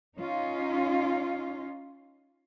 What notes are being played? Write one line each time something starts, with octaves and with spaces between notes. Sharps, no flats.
C#4 D#4 F4